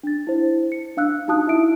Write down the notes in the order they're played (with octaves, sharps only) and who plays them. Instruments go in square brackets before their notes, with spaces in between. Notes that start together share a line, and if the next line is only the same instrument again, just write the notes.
[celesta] D4 A6
E4 C5
C#7
D4 F5 E6 F#6
D#4 F#4 A5 D#6 F#6
E4 E5 D7